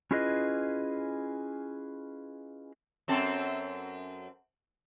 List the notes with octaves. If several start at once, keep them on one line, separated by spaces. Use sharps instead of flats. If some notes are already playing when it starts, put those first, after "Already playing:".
C#4 E4 F4 G#4 B4 D#5
F#2 C4 A4